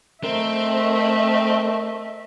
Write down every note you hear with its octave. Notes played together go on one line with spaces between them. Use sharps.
A3 C4 A#4 D#5 E5